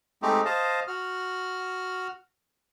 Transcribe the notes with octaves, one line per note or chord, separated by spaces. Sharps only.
G#3 A3 C4 D#4 G4
C5 D#5 F5 A5
F#4 F6